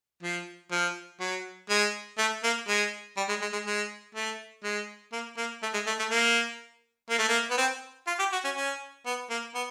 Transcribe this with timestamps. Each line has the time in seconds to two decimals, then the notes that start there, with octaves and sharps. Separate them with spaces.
0.23 F3
0.71 F3
1.20 F#3
1.70 G#3
2.18 A3
2.44 A#3
2.68 G#3
3.17 G3
3.29 G#3
3.42 G#3
3.53 G#3
3.66 G#3
4.15 A3
4.64 G#3
5.12 A#3
5.37 A#3
5.63 A3
5.74 G#3
5.87 A3
5.99 A3
6.10 A#3
7.10 A#3
7.19 A3
7.29 A#3
7.51 B3
7.58 C4
8.07 F4
8.19 G4
8.32 F#4
8.45 C#4
8.56 C#4
9.06 B3
9.30 A#3
9.55 B3